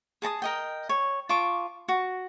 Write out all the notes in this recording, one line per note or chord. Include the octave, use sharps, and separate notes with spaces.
G#4 A5 A#5 D#6
A#4 D#5 G5
C#5
F4 A5 C#6 D6
F#4